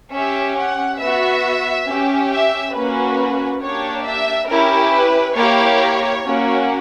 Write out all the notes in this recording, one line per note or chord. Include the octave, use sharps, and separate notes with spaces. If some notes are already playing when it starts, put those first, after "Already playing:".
C#4 G4 E5
F#5
B3 F#4 E5
C#4 G4
E5
A#3 C#4 F#4 B4
A#3 D4 G4 C#5
E5
C#4 E4 G4 A#4
B4
A#3 E4 G4 C#5
A#3 C#4 F#4